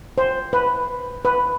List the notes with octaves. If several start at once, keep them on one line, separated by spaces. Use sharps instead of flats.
C5
B4
B4